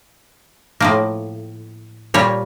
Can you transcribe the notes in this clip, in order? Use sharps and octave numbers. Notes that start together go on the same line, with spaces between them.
A2 F3 A#3
A#2 G3 A#3 C#5